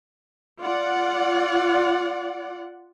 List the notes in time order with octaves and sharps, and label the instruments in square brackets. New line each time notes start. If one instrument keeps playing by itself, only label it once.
[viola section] F4 D5 F#5